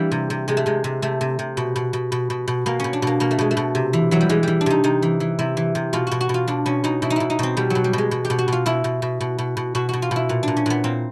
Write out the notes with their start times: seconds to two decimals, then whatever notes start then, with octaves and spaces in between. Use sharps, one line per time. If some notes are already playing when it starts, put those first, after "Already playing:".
Already playing: E3 G3 A#3 D4
0.11 C3
0.30 C3
0.48 C3 G#3
0.57 A3
0.66 C3 G#3
0.84 C3
1.02 C3 A3
1.21 C3
1.39 C3
1.57 B2
1.76 B2
1.93 B2
2.12 B2
2.30 B2
2.48 B2
2.66 B2 A#3
2.80 B2 C#4
2.93 D4
3.02 B2 A#3
3.20 B2 A#3
3.31 A3
3.39 B2 G#3
3.51 A3
3.57 B2
3.75 C3
3.93 E3
4.11 E3 F#3
4.21 G3
4.29 E3 G#3
4.43 E3 G3
4.61 D4
4.66 C3 D#4
4.84 C3 D#4
5.02 E3
5.20 E3
5.39 C3 E4
5.57 E3
5.75 C3
5.93 B2 F4
6.07 B2 F#4
6.21 F#4
6.29 B2 F4
6.48 B2 D4
6.66 B2 C#4
6.84 B2 D#4
7.02 B2 E4
7.10 D#4
7.16 B2 E4
7.30 D#4
7.39 B2 C4
7.57 B2 G3
7.70 B2 F#3
7.84 G3
7.93 B2 G#3
8.11 B2
8.25 G4
8.30 B2
8.39 F#4
8.48 B2 F4
8.66 B2 E4
8.84 B2
9.02 B2
9.20 B2
9.38 B2
9.57 B2
9.75 B2 F#4
9.89 B2 F#4
10.02 F4
10.11 B2 E4
10.29 A#2
10.43 A#2 D4
10.57 C#4
10.66 A#2 B3
10.84 A#2 C4